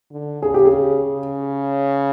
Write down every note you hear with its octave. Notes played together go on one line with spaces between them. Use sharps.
D3
C#3 G#4
G4
G#4
C#3